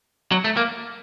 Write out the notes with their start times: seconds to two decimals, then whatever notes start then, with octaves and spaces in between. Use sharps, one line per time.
0.32 F#3
0.44 A3
0.57 A#3